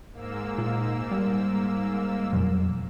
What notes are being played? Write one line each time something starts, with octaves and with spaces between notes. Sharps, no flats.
G#2 A#3 E6
A#2
G3
F2 B2 F#3